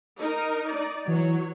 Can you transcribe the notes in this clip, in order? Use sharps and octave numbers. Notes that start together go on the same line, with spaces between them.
D#4 A#4
D#4 D5
E3 F#3 C#5